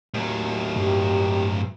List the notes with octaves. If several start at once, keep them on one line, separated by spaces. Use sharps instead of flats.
D#2 A2 F#3
G2 G4